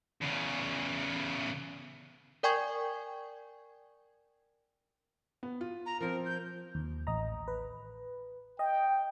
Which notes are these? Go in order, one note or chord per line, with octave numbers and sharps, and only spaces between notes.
E2 C#3
A#4 D5 G5 G#5 C#6 G#6
B3
F4
A#5
F3 C4 A#4
G6
D#2
A1 D#5 A#5
B4
D#5 G5